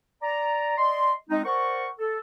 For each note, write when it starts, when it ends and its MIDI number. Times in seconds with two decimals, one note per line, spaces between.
0.22 0.76 74
0.22 0.76 82
0.78 1.12 74
0.78 1.12 75
0.78 1.12 84
1.30 1.42 56
1.30 1.42 60
1.30 1.42 63
1.45 1.88 70
1.45 1.88 72
1.45 1.88 74
1.45 1.88 78
1.45 1.88 85
1.99 2.18 69